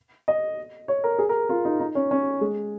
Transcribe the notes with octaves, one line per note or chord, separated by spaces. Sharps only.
D#5
C#5
A#4
G#4
A#4
F4
D#4
D#4
C#4
C#4
G#3